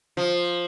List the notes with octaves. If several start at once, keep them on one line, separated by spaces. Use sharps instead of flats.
F3